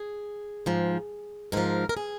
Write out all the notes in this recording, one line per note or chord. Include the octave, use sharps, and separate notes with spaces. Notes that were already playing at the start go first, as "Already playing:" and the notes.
Already playing: G#4
G#2 F3
G#2 F3 A#4
A#4
G#4